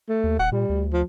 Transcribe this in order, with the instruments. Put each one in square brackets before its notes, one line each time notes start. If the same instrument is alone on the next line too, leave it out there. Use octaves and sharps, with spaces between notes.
[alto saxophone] A3
[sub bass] D#2
[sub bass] D#1 [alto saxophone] F#5
[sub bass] A#2 [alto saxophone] G3
[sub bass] D2
[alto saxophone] F3